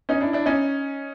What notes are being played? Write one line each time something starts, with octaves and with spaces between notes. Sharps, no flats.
C#4 D#4
D4 E4
D4 E4
C#4 D#4